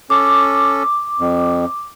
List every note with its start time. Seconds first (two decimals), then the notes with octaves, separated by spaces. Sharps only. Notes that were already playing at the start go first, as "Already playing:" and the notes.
0.10 C#4 A4 D6
1.19 F2